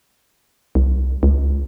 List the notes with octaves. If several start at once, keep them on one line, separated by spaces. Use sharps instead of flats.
C2
C#2